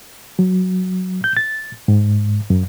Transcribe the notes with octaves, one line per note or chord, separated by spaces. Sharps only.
F#3
G6
A6
G#2
F#2